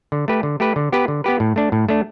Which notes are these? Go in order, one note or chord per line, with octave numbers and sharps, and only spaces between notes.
D3
A3 G4 B4
D3
A3 G4 B4
D3
B3 G4 B4
D3
B3 G4 B4
A2
A3 D4
A2
A3 D4